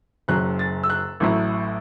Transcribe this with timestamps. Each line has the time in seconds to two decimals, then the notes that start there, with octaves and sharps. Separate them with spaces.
0.28 F#1 F#2 F#3 F#6
0.59 A6
0.83 E6
0.90 F#6
1.20 A1 A2 F#3 A3 E4